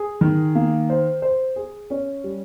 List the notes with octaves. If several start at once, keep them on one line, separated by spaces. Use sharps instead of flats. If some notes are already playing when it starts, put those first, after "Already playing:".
Already playing: G#4
D#3
A#3
C5
C5
G#4
C#4
G3